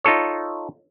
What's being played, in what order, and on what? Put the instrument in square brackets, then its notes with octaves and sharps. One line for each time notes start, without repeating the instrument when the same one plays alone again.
[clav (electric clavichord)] D#4 F4 A4 C#5